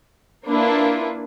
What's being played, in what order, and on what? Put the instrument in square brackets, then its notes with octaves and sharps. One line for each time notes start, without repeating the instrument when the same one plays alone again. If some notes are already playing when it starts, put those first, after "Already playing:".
[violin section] A#3 D4 E4 F4 B4